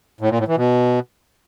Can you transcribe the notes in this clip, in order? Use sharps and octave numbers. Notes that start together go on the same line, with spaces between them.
A2
A#2
A2
E3
B2